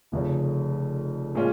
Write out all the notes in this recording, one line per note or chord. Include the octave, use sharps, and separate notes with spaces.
F1 F2 C#3
A#2 G#3 C#4 F4